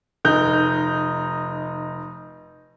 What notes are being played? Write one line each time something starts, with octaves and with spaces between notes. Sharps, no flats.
F1 D#4 G6